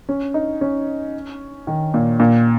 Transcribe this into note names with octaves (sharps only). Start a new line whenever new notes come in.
C#4
D#4
C#4
D#3
A#2
A#2